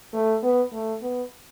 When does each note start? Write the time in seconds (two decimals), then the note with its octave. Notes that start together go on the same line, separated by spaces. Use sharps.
0.13 A3
0.43 B3
0.72 A3
1.02 B3